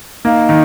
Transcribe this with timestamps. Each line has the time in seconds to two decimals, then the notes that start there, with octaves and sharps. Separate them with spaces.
0.25 A#3 D#4
0.49 D#3